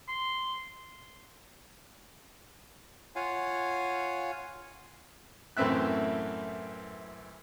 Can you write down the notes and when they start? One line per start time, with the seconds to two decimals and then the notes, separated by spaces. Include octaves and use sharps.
0.08 C6
3.16 F4 C#5 F5 F#5 G#5
5.57 F#2 A2 E3 C4 E5 F#6